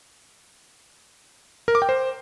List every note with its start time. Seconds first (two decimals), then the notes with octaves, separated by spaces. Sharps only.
1.68 A#4
1.75 D6
1.82 G5
1.89 C5